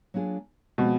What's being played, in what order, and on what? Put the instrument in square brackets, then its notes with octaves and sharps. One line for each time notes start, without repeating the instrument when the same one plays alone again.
[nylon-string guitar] F#3 A#3 D4 F4 G#4
[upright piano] B2 [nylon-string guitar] F3 G#3 C4